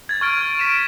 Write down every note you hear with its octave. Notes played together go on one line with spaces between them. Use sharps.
G#6 A6
C#6 F6 D7
B6 D7 E7